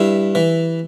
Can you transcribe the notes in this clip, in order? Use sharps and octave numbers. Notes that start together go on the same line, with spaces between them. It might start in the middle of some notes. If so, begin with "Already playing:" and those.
Already playing: G2 E4
E3